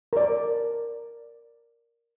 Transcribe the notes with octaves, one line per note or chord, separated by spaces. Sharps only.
A#4 D5